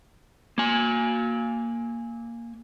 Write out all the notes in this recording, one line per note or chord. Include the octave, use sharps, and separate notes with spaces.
A#3 G#5